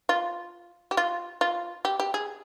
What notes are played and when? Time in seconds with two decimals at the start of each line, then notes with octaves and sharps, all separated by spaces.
0.09 F4
0.91 G4
0.97 F4
1.41 F4
1.85 G4
2.00 G4
2.14 G#4